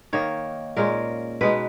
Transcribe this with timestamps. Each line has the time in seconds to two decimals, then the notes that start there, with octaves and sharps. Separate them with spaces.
0.13 D#3 A#3 D#4 C#5
0.77 A#2 G#3 C#4 A#4
1.41 B2 G#3 D#4 B4